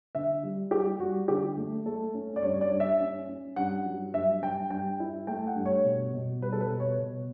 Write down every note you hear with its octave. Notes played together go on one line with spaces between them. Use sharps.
D3 E5
G3
G3 G4
G3 F#4
D3 G4
A3
A3 A4
C#4
D5
G2 C#5
C#5
D5
G2
E5
C#4
C#4
G2 F#5
F#3
G2 E5
G2 G5
G2 G5
E4
A3 G5
F#5
G2
C#5
B2
B2
G3 B4
A4
B4
B2
C#5
B2